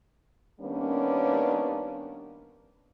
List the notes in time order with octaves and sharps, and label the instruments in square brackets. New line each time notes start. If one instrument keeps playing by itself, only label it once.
[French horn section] D#3 G3 A#3 B3 C#4 D4